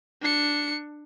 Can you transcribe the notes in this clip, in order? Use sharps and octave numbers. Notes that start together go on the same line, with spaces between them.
D4 C#7